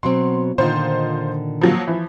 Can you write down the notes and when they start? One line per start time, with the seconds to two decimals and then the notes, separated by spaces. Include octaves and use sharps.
0.03 B2 F#3 C4 C6
0.58 A#2 D3 D#3 D#4 F4 C5
1.61 F3 F#3 A#3
1.87 E3 F3